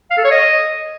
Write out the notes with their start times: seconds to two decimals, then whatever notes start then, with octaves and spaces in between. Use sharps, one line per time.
0.11 F5
0.17 A4
0.24 C#5
0.31 D#5